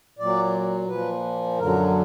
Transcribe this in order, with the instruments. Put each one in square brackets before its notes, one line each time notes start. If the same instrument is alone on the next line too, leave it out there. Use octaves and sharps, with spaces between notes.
[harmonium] A#2 F#3 D5
A#2 F3 B4
F#2 D3 F#3 A#4